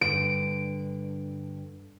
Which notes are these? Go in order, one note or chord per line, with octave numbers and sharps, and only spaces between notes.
G2 D3 D7